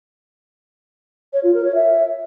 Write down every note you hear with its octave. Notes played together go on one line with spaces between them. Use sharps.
C#5
F4
A#4
C#5
E5